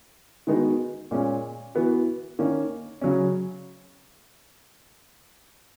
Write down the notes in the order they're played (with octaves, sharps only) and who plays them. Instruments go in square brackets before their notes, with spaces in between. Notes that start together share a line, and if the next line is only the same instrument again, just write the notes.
[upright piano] D#3 G#3 B3 D#4 F#4
A#2 G#3 C#4
E3 B3 F#4
D#3 A#3 C#4
C#3 F#3 C#4